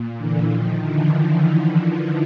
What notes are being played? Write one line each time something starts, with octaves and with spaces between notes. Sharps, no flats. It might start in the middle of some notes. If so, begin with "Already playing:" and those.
Already playing: A#2
D3 E3
D#3 F3
D3 E3